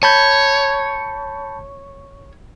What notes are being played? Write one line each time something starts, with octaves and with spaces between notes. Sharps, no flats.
C#5 A5 B5 G6